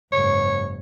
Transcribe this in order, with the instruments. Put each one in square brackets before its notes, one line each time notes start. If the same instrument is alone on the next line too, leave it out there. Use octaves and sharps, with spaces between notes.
[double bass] F#1 G#2 [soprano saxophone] C#5